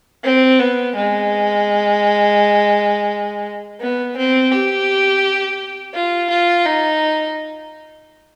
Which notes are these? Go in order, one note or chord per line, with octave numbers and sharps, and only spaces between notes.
C4
B3
G#3
B3
C4
G4
F4
F4
D#4